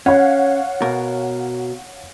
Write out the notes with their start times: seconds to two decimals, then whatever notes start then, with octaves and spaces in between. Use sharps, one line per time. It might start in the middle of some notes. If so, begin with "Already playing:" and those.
0.06 C#4 C#5 F5 F#5
0.82 B2 A#4